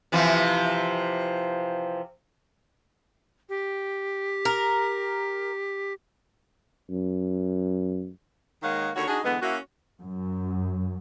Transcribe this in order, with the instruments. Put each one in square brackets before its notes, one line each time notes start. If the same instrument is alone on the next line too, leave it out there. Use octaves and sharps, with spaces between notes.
[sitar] C3 E3 F3
[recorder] G4
[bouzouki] A#4
[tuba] F#2
[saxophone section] D#3 G#3 A#3 C#5 F5 F#5
D#2 D3 F#4 C#5
D4 D#4 F#4 G#4
D3 E3 G#3 B3
A#3 C#4 E4 F#4
[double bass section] F#2